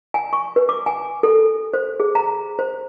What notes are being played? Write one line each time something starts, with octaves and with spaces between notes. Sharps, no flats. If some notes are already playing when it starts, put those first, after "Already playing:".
G#5
C#6
B4
D6
G#5
A4
C5
G#4
A#5
C5